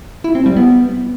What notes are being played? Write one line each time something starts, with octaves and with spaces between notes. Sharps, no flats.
E4
C4
G3
B3